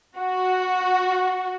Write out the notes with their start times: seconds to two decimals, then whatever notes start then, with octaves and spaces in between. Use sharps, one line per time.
0.18 F#4